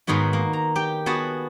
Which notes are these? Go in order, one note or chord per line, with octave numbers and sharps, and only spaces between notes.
G#2 D#3 G#3 B3 F#4
A#3
A#5
G4 G5
B3 F#4 G#4 A5